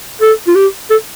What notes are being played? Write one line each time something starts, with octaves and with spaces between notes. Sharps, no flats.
A4
F4
G4
A4